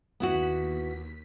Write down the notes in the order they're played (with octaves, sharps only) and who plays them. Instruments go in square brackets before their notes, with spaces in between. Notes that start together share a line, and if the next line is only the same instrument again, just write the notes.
[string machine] D#2 B6 [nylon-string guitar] B3 E4 F#4